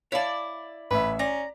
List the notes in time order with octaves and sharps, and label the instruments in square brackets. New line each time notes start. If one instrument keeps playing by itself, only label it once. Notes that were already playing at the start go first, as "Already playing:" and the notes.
[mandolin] E4 D5 [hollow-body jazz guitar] C#5 F5 A5
[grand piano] A1 E5 [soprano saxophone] B4
[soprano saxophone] C#4 [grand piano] D5 [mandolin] A#5